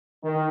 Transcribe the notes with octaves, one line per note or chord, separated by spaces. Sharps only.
D#3